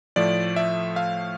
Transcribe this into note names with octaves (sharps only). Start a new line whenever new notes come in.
A2 F3 A3 D5
E5
F5